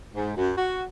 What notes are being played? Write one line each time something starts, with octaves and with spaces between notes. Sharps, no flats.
G#2
F#2
F#4